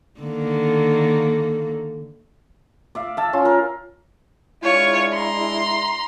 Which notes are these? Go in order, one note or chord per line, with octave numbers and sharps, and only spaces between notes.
D3 D#3 A#3
D5 E5 F5
E5 A5
C#4 F4
A#4
G#3 D4 E4 F4 C#5
A#5 C6